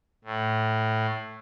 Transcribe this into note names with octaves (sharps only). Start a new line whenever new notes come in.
A2